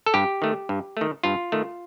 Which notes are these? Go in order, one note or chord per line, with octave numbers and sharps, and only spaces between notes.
A4
G2 G4
D#3 A3
G2
D#3 A3
G2 F4
D#3 A3